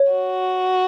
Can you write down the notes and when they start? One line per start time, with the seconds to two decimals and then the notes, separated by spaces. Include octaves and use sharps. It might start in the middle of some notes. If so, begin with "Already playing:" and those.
Already playing: C#5
0.12 F#4